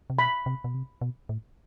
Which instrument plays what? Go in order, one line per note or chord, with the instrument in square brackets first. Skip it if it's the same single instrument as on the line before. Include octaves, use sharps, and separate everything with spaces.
[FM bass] C3
[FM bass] B2 [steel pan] B5
[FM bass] C3
B2
C3
B2
A2